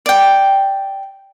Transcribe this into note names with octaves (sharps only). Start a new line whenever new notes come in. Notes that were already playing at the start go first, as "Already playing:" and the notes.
D5 G5